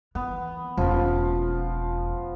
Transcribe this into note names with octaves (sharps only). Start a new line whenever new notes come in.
E3 B3
E1 F3 C#4 F4